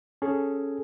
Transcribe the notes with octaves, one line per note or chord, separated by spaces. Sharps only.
C#4 G#4 A4